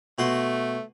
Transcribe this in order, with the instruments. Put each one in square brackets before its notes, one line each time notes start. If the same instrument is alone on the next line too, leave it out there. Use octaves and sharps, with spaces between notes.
[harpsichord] B2 F#4 C6 [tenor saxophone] A3